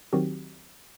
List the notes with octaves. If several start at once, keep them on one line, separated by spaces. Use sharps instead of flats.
D#3 F#3 C4 F#4 G4